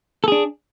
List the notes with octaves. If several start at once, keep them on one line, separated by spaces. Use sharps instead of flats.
D4 G#4 A4